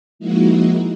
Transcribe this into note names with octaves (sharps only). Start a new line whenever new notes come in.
F3 G#3 A#3 D#4 E4 F#4